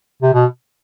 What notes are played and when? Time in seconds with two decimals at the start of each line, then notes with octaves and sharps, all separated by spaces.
0.22 C3
0.34 B2